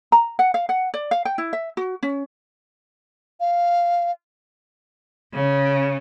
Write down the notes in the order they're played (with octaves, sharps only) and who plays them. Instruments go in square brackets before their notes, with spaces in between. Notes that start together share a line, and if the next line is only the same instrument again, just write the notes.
[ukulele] A#5
F#5
F5
F#5
D5
F5
G5
E4
E5
F#4
C#4
[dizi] F5
[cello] C#3